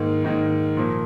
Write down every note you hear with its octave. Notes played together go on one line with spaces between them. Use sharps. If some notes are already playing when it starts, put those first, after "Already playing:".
Already playing: G#2 D#3 A#3
G#2 D#3 A#3
A#2 F3 A#3